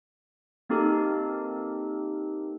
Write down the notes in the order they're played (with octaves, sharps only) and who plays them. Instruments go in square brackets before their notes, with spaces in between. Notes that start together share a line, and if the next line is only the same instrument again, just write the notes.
[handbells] A#3 C4 D#4 G4 A4 A#4